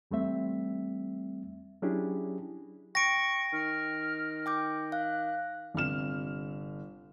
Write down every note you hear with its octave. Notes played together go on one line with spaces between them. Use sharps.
E2 G3 A3 C4 E5
F#3 C#4 D4 E4 G4 G#4
G5 C#6 A#6 D7
D#3 F6
G5 D6 G6
F5 F#6
G1 C3 F6 E7